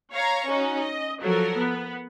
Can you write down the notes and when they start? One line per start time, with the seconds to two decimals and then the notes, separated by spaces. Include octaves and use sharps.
0.13 C#5 F5 A#5 C#6
0.47 C#4 D#4 F#4
0.81 D#5
1.22 F3 F#3 A4 A#4
1.59 B3